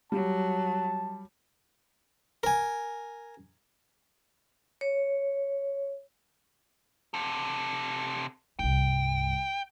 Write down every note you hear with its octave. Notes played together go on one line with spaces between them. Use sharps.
F#3 G3 A5
A#4 G#5
C#5
C3 A4
C2 G2 G5